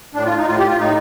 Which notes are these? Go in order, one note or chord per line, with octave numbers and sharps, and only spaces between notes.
A2 D4
F4
D#4
A2 F4
G4
F4
A2 D#4